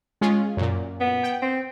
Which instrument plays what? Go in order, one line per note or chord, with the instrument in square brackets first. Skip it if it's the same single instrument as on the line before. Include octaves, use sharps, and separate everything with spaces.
[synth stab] G#3 C#4 F4
F#2 A#2
[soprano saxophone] B3
[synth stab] G5
[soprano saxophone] C4